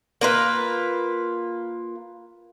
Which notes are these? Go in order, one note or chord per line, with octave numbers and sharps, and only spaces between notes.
A#3 F4 B4